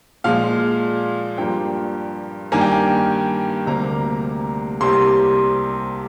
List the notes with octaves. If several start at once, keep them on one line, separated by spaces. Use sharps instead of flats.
A#2 F3 G#3 F5
G2 F3 A#3 G5
G2 D#3 G3 A#3 G#5
G5
G#5
D2 C3 G3 A#3 A#5
C2 C3 G3 A#3 C6